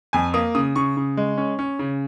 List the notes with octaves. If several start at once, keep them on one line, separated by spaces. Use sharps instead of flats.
F2 G#5
A#3 D#6
C#3 D#6
C#3 C#6
C#3
G#3
C#4
C#4
C#3